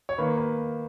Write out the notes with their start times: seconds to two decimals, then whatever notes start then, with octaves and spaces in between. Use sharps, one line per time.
0.09 C#5
0.18 D#3 A#3 B4
0.38 B4